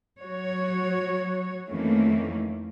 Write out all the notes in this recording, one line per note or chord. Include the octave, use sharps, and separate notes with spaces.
F#3 F#4 C#5
F2 D#3 E3 A3 A#3 C#4